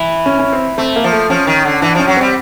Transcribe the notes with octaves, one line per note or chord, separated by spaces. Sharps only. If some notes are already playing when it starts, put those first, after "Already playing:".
Already playing: E3
C#4
C#4
C4
A3 C4
A#3
F3
A3
F3 C#4
D#3
D3
E3 D4
F3 C#4
F#3
G3 C4